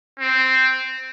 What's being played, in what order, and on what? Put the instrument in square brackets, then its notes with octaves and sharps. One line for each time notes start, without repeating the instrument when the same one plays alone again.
[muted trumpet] C4